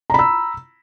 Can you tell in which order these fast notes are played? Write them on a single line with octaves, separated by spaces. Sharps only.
A#5 B5 E6